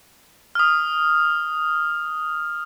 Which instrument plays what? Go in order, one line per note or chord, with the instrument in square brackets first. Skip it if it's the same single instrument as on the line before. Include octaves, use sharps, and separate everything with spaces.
[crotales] D#6 F6